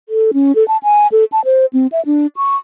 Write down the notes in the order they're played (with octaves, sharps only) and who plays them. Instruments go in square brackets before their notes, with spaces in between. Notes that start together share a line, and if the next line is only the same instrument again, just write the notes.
[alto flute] A4
C#4
A4
A5
G#5
A4
A5
C5
C4
E5
D4
C#6